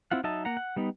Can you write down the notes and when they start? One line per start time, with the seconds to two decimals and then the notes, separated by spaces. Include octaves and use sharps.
0.11 C4 E4 F4 F#5
0.24 F#3 D#4 D#5 E5 A5
0.45 A#3 F#5 A#5
0.57 F#5
0.76 G3 B3 D#4